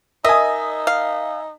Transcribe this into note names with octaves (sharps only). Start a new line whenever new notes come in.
D#4 A#4 D#5 E5 G#5 D#6
F5